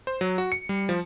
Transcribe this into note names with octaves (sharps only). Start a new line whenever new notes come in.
C5
F#3
F#4
C#7
G3
F3